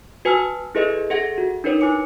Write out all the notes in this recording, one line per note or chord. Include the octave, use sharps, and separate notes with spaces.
F#4 B4 G#5 A5 E6 F6
E4 G#4 A4 B4 D#5 E5
G#4 A4 E5 F#5 G#6 A#6
F#4
D4 D#4 A#4 B4 C#5
E4 B4 G#5 D6 C#7